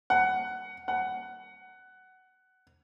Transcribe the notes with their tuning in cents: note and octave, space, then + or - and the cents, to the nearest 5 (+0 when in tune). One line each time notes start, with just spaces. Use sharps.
F#5 +15
F#5 +15